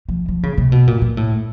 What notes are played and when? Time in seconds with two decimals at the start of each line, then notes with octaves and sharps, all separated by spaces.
0.09 F3
0.28 F3
0.43 C#3
0.57 C3
0.72 B2
0.87 A#2
1.01 A#2
1.17 A2